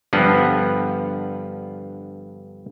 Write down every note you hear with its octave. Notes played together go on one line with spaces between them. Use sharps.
G2 D3 F3 B3 D4 F#5